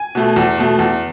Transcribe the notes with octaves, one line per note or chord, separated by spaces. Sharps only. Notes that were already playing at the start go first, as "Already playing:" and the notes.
Already playing: G#5
B2 A3
E2
B2 A3
E2